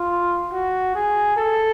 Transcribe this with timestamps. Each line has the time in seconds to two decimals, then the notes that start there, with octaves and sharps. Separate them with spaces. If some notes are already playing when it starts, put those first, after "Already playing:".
Already playing: F4
0.52 F#4
0.95 G#4
1.37 A4